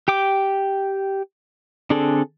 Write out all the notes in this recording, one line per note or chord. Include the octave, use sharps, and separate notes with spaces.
G4 G5 D6
D3 C4 D4 G#4 A4